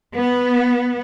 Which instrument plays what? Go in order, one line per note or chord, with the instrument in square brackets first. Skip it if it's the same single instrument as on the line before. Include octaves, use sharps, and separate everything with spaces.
[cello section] B3